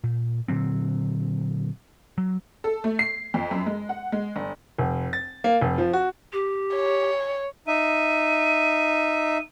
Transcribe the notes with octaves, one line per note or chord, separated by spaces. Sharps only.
A#2
A#2 D3 F#3 C4
F#3
A4
A3
C7
F2
F#2
G#3
F#5
G#3
G1
F1
A6
A#3
F1
F3
F#4
G4
C#5
D#4 E5 D#7